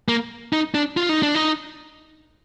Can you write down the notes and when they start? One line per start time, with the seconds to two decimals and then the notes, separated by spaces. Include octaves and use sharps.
0.08 A#3
0.53 D#4
0.75 D4
0.97 F4
1.09 D#4
1.23 D4
1.35 D#4